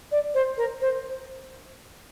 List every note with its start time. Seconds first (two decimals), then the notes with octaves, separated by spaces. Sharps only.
0.12 D5
0.34 C5
0.58 A#4
0.81 C5